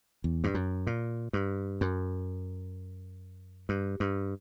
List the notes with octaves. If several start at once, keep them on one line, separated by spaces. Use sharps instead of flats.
E2
G2
F#2
A#2
G2
F#2
G2
G2